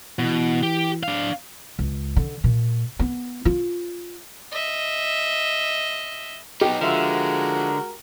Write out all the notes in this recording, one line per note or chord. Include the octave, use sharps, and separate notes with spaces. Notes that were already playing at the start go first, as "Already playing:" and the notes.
B2 E3
G4
D4 F5
C#2
D3
A#2
B3
F4
D#5 E5
B3 D#4 G4
D3 F3 G#3 F#4 A#4 E5